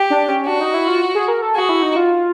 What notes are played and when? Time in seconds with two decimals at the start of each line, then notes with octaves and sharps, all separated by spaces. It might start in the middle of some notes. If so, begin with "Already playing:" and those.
Already playing: G4
0.10 D4
0.28 C#4
0.46 D4 F#4
0.60 D#4
0.74 E4
0.88 F4
1.15 G#4
1.28 A#4
1.42 A4
1.55 F#4 G#4
1.69 E4
1.83 D#4
1.96 F4